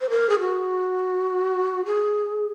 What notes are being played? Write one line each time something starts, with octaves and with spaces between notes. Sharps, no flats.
C5
A#4
G#4
F#4
G#4